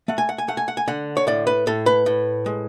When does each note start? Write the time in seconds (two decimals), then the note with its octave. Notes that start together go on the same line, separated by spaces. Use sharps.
0.08 A3 F#5
0.18 G#5
0.29 F#5
0.38 G#5
0.48 A3 F#5
0.57 G#5
0.68 F#5
0.77 G#5
0.88 D3 F#5
1.17 C#5
1.27 A2 D5
1.47 B4
1.67 A2 A4
1.86 B4
2.06 A2
2.46 G#3